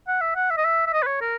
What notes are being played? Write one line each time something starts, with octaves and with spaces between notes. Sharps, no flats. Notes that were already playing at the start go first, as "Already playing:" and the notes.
F#5
E5
F#5
E5
D#5
E5
E5
D#5
B4
C#5
A#4